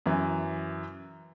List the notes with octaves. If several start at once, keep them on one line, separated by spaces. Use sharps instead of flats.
F#2 E3